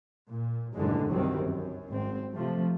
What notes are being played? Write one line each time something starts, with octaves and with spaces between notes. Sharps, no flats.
A#2
F#1 D#2 A2 D3 E3 G#3
G1 C2 G2 D#3 F#3 C4
F#2
G#1 C4
C3 F3 A3